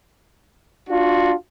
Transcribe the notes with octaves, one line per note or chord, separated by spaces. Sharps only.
D4 F4 F#4